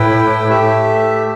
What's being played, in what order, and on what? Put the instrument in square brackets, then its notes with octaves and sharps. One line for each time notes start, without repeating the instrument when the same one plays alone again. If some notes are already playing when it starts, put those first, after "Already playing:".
Already playing: [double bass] A2 [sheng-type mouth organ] E4 B4 G5
[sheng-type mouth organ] A3 G4 E5